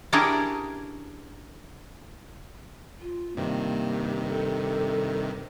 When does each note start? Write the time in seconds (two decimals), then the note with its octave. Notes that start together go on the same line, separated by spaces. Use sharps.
0.13 C#4 D4 E4 G4 G#4 A#4
3.01 F4
3.36 G2 C3 D#3 A#3
4.29 A4